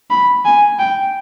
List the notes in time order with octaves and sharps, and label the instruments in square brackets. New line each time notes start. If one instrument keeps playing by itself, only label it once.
[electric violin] B5
G#5
G5